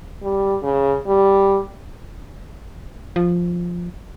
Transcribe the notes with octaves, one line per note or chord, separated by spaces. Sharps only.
G3
C#3
G3
F3